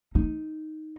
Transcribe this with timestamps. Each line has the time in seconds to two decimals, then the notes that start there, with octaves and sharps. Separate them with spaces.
0.15 D#4